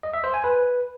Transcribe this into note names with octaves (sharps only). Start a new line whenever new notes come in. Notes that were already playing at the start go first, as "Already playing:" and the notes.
D#5
E5
C5
G#5
B4